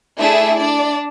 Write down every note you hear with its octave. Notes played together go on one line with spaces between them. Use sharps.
A3 D4 E4 G#4 E5
D4 D5